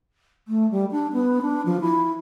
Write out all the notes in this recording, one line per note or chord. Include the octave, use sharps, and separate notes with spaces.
A3
G3
D4
B3
D4
F3
E4